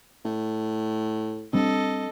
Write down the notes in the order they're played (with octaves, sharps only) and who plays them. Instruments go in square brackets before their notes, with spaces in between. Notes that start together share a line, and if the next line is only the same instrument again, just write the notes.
[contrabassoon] A2
[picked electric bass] G3 C4 D4 [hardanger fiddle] A4 D#5